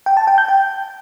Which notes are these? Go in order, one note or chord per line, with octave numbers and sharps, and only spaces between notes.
G5
A5
G5
G6
G5